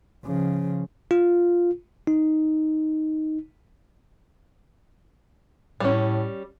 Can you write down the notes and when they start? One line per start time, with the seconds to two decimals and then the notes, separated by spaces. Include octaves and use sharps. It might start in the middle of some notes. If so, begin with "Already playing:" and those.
0.24 C#3 F3
1.11 F4
2.07 D#4
5.80 A2 G3 C#4